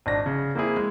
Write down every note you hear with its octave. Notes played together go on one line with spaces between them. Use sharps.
G#1 D4 A#6
C#3
A#3 C4 E4 G#4
G#3